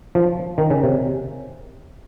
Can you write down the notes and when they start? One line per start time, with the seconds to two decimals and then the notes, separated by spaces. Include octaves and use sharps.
0.15 F3
0.58 D#3
0.70 C#3
0.83 C3